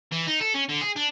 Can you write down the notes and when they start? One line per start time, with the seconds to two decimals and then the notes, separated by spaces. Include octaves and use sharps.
0.12 E3
0.27 D#4
0.41 A4
0.55 C#4
0.69 D3
0.81 G#4
0.96 D4